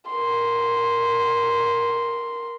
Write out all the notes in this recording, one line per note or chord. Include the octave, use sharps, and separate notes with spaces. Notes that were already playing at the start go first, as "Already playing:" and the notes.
A#4 C6